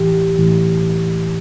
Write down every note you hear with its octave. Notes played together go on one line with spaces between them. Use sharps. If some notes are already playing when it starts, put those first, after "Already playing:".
Already playing: A2 E3 G4
A2 E3